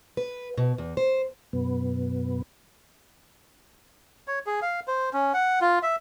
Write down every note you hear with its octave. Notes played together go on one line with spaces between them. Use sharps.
B4
B2
E2
C5
F#2 B2 B3
C#5
G#4
F5
C5
C#4
F#5
F4
E5